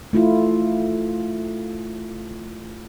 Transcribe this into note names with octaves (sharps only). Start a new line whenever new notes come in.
A3 E4 F4